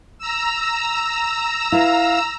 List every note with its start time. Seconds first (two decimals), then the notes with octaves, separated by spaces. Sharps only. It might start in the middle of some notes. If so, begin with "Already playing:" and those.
0.19 A#5 E6
1.72 E4 B4 F5